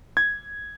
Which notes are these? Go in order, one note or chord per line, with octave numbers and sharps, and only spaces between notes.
G#6